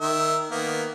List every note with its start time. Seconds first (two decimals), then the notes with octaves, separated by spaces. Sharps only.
0.01 D#3 A#4 E5
0.51 D#3 A#3 B3